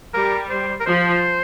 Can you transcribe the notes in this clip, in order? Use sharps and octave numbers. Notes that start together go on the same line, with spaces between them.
G3 A#4
C5
A#4
F3 C5